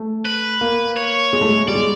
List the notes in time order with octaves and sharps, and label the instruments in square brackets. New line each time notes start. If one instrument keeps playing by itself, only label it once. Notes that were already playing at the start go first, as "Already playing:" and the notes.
Already playing: [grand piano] A3
[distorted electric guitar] B4
[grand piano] A#3
[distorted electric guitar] C#5
[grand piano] G#3
A3
G#3
[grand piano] G3 [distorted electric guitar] D5
[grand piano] G#3